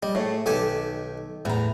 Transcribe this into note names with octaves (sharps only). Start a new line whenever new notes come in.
G3 D#5
A2 A3 G#4 C#5
B1 D#3 G4 A4 G#5
E2 A2 A#5